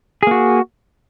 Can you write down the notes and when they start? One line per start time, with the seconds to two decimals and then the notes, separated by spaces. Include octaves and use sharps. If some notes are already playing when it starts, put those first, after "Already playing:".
0.23 G#4
0.27 A#3
0.31 F#4